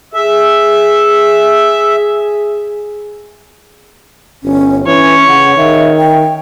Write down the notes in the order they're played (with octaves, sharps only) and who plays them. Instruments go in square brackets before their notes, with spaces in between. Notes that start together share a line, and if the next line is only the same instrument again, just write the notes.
[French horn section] G#4 [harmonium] E5
[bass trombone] G1 [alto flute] C#4
[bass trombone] E3 [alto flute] C#4 [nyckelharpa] C#5
[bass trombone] C#3 [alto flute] F#5
[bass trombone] D#3 [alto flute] E5
[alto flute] G5